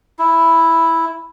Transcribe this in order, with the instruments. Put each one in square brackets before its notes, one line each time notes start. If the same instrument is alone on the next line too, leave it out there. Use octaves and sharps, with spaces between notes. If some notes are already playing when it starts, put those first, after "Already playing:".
[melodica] E4